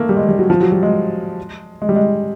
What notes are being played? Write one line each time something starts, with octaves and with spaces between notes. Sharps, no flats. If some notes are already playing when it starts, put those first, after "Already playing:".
Already playing: A3 A#3
G3
G#3
G3
F#3
F3
F#3
G3
G#3
G#3
G3
G#3